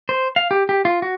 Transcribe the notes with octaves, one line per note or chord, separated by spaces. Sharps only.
C5
F5
G4
G4
F4
F#4